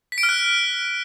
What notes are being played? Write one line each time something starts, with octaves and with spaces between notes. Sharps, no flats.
B6
D7
F6
F#6